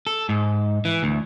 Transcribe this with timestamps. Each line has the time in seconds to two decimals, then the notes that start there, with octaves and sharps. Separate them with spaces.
0.07 A4
0.29 G#2
0.85 E3
1.03 D2